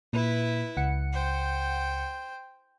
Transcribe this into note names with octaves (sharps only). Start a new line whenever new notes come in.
A#2 E4 B4
C#2 F#5 C#7
C5 G5